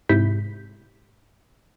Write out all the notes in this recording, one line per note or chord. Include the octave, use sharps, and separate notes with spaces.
G#2 C3 E4 G6 B6